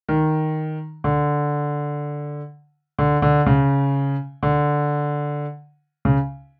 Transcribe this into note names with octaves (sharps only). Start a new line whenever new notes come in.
D#3
D3
D3
D3
C#3
D3
C#3